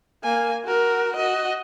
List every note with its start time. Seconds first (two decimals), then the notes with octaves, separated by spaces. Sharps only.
0.23 A#3 G#5
0.64 F#4 A#4
1.16 F#4 D#5